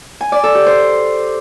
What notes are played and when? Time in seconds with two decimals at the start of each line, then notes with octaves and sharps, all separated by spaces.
0.21 G#5
0.32 D5
0.44 A4
0.55 G4
0.66 C5